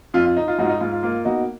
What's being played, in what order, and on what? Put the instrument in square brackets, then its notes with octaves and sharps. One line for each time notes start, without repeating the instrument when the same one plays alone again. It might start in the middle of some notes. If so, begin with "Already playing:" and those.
[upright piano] F2 F4
F4
D#4
F4
G#2 D#4 F#4
F4
D#4
G#2 F4
F4
A#3 F4
B2 D#4 F#4